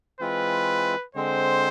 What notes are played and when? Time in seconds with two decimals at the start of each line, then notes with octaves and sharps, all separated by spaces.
0.20 E3 G#3 C4 F4 B4
1.15 D3 G#3 C4 C5